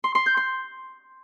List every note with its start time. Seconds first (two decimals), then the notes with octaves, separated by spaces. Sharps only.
0.04 C6
0.15 C6
0.26 G6
0.37 C6